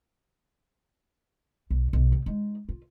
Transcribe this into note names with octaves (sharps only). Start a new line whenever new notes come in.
B1
B1
C3
G#3 D#4
F4